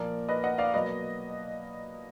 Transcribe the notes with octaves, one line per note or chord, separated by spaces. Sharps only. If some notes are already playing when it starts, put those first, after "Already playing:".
Already playing: A#2 F3 A#3 A#4 D5
B4 D#5
D#5 F#5
D5 F5
B2 F#3 A#3 B4 D#5